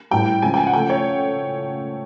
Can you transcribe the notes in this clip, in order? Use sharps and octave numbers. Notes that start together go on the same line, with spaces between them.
A2 E3 G3 G5
C#3 F3 G#3 G#5
G5
G#5
F#5
C#3 F3 A3 G5
C#5